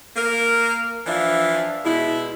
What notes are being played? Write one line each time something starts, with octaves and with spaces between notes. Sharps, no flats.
A#3 A#4
E3 F3 D4 E5 F5
B2 G#3 E4